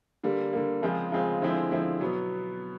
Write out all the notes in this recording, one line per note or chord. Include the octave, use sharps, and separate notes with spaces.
D3 G3 A#3
D3 G3 A#3
C#3 F3 G#3 C4 F4
C#3 F3 G#3 C4 F4
D3 F3 G#3 C4 E4
D3 F3 G#3 C4 E4
B2 F#3 B3